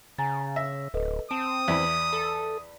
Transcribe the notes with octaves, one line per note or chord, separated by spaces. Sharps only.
C#3 G#5 A#5 A6
E5 E6 A#6
D1 A4 B4 D#5
C4 A5 D#6 D7 E7
E2 E4 D5 B6
A4